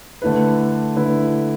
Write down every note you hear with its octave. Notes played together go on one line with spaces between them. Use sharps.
D3 A3 E4 B4
D3 A3 E4 B4